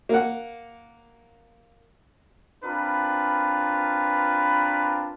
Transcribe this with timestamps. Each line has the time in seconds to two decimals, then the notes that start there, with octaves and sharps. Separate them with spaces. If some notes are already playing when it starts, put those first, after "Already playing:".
0.09 A#3 F#5
2.64 C4 D4 F4 A#4 B4 B5